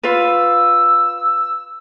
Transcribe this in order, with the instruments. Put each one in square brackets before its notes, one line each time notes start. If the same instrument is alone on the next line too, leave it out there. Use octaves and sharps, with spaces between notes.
[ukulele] F4 B4 [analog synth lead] E6